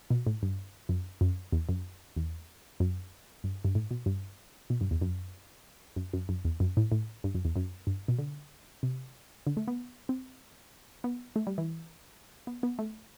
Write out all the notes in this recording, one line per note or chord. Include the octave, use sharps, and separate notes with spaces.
B2
A2
G2
F#2
F#2
E2
F#2
E2
F#2
G2
G2
A2
B2
G2
B2
G2
E2
F#2
F#2
F#2
F#2
E2
F#2
A2
A2
G2
F#2
E2
F#2
G2
B2
D3
C3
D3
A3
B3
C4
B3
A3
G3
E3
B3
B3
A3